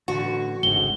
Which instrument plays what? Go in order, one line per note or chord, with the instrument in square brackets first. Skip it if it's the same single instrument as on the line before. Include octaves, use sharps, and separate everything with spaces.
[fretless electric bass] A1 D3 [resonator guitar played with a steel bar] F#4
[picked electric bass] G#1 [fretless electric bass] C#2 G#2 D3 [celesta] G7